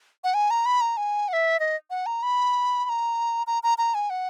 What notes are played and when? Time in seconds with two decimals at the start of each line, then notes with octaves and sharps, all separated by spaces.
0.24 F#5
0.34 G#5
0.50 A#5
0.66 B5
0.81 A#5
0.97 G#5
1.28 F#5
1.33 E5
1.60 D#5
1.90 F#5
2.06 A#5
2.23 B5
2.85 B5
2.89 A#5
3.47 A#5
3.63 A#5
3.78 A#5
3.94 G#5
4.10 F#5